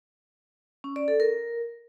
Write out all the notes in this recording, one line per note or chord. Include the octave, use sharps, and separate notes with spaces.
C#4
D5
A4
A#4